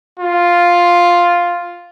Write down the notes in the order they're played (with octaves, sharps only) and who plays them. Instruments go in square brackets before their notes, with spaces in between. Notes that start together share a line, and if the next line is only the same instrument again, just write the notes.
[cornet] F4